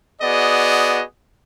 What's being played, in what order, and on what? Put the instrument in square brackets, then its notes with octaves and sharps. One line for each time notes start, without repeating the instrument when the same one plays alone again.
[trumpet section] B3 F#4 G#4 D5 D#5